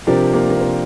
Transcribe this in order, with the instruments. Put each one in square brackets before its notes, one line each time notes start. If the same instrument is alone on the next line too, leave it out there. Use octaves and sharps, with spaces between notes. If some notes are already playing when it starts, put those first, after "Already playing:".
[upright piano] C3 [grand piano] F3 D4 G4 A#4 D5
[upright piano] A#3
A#3
C4